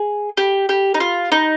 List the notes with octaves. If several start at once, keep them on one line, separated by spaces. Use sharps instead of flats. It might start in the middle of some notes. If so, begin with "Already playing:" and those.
Already playing: G#4
G4
G4
D#4
F4
D#4